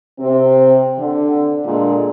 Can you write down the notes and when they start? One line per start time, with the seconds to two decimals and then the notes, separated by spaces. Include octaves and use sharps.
0.20 C3 C4
0.99 D3
1.65 A#2 D3 G#3